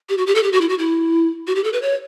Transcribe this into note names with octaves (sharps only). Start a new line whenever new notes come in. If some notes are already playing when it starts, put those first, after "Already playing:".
G4
F#4
G4
A4
G4
F#4
E4
F#4
E4
F#4
G4
A4
B4
C#5